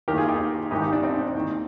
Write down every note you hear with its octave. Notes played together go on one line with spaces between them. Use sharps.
D#2 D#3 G4 A#4
F4 G#4
D#4 G4
A#1 G#2 D#3 D#4 G4
D#4 G4
D4
C4 D#4
D#2 D#3